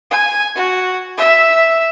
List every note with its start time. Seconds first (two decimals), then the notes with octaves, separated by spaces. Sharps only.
0.11 G#5
0.55 F#4
1.17 E5